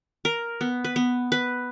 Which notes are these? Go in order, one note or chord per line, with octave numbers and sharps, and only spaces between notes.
A#4
B3
B4
B3
B4